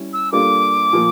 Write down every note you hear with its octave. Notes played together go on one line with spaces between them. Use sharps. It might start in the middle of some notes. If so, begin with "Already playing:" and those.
Already playing: G3 C#4 E4
E6
G3 A#3 D4 F4 A4 D6
A#2 F3 A#3